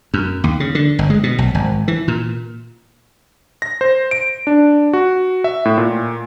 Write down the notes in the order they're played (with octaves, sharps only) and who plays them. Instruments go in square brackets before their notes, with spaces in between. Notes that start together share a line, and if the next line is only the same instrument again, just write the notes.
[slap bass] F#2
D#2
C#3
D3
G1
G#3
B2
B1
G#1
E3
A#2
[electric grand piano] A#6
C5
D7
D4
F#4
E5
A2
A#2